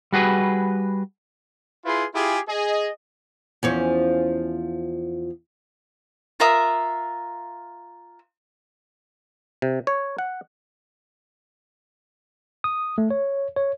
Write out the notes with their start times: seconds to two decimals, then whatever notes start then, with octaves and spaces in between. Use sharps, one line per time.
0.12 G3 F#4 G#4 B4
1.85 E4 F4 G#4 B4 C6
2.14 E4 F4 G4 G#4
2.49 G#4 D#5
3.63 E2 F3 C#4
6.40 F4 A#4 E5 D#6
9.62 C3
9.87 C#5
10.18 F#5
12.64 D#6
12.98 A3
13.11 C#5
13.57 C#5